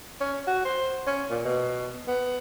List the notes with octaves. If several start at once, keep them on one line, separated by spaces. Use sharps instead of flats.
C#4
F#4
C5
C#4
A#2
B2
B3